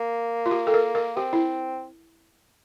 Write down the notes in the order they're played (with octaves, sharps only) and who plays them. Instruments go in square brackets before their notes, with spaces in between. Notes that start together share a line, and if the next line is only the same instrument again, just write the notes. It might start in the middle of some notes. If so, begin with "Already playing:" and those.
Already playing: [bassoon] A#3
[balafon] F4
G4
A4
A#4
A#4
[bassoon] C4 [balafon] G4
[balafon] E4